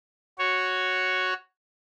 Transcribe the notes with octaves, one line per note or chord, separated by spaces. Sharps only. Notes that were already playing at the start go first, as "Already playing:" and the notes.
F#4 C#5